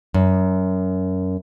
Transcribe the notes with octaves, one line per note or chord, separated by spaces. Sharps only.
F#2